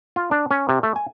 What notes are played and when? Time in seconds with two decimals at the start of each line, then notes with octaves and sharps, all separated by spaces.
0.16 F4
0.31 D4
0.51 C#4
0.69 C3
0.83 A3
0.96 G#5